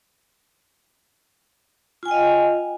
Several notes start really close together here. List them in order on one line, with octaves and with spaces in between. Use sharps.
F4 G#5 G5 D#5 F5